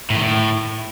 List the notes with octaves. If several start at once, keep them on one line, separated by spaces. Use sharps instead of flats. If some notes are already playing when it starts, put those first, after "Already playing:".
A2
D#3
A2